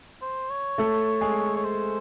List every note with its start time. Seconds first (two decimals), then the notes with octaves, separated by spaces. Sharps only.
0.22 C5
0.50 C#5
0.78 A3 A4
1.21 G#3 G#4
1.56 C#5
1.64 C5